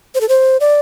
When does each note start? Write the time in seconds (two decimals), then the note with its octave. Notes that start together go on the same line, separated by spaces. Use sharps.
0.15 C5
0.21 A4
0.29 C5
0.60 D5